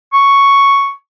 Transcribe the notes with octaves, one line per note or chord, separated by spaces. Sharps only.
C#6